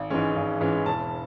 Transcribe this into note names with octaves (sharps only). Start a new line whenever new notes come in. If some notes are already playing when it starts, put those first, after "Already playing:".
Already playing: G#1
G#2 E3 G#3 C#4
G#1
G#2 E3 G#3 C#4
E1 A5